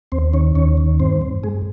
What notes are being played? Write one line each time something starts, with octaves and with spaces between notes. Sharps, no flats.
D#2 C4 C5
D#3 C#4 C#5
D#2 C#4 C#5
D#3
G2 C4 C5
G2
G2 G#3 G#4